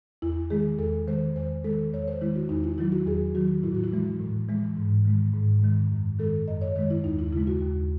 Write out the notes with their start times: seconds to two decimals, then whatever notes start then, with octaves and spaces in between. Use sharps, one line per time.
0.22 E2 E4
0.50 D#3 G#3 G#4
0.79 E2 A4
1.07 D#3 G#3 C5
1.36 E2 C5
1.64 D#3 G#3 A4
1.92 E2 C#5
2.08 C5
2.21 D#3 G#3 E4
2.36 F#4
2.49 E2 D#4
2.64 E4
2.78 D#3 F#3 E4
2.92 F#4
3.06 E2 G#4
3.35 D#3 F#3 F#4
3.63 A2 E4
3.74 F#4
3.84 E4
3.93 E3 G#3
4.20 A2
4.49 E3 G#3
4.77 G#2
5.05 D#3 G#3
5.34 G#2
5.63 D#3 G#3
5.91 F#2
6.19 D#3 G#3 A4
6.48 F#2 D#5
6.61 C#5
6.76 D#3 G#3 C#5
6.90 E4
7.04 D#2 D#4
7.19 E4
7.33 C#3 E4
7.37 G#3
7.47 F#4
7.61 D#2